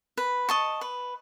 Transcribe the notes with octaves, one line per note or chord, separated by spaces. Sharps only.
B4
D#5 A5 C#6
B4